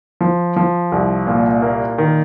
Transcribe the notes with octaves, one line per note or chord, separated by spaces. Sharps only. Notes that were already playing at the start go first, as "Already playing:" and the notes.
F3
F3
C2
A#2
A#3
D#3